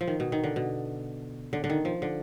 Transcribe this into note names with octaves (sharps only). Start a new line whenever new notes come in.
F3
D#3
B2
D#3
D3
B2
D3
D3
D#3
F3
D3